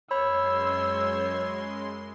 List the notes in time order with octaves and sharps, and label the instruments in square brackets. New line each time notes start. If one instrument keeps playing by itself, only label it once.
[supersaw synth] F#2 G#3 C6 [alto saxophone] C#5 [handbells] B5 [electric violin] E6